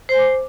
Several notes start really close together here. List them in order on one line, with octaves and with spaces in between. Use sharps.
C5 G#5 D6